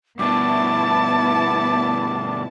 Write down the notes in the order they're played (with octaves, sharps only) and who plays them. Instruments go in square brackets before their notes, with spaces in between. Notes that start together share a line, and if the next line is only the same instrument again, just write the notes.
[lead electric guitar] G2 B2 [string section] B3 E4 A5 [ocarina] D6